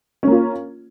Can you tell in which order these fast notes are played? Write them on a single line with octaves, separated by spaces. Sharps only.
C#4 A#3 F4